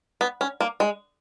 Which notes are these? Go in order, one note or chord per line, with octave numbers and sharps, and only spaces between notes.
B3
C#4
A#3
G#3